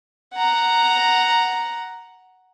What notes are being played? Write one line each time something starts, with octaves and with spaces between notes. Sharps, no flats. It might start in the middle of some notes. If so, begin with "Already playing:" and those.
F#5 A#5